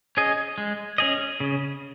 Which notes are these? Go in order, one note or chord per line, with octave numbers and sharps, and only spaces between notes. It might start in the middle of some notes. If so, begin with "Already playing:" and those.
C#4 G#4 D#5
G#3
C#4 G#4 D#5
C#3